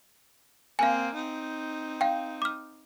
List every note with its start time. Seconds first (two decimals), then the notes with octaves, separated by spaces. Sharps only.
0.79 A#3 C4 F5 G#5
1.14 C4 D#4
2.01 F5 G5
2.42 D6 F6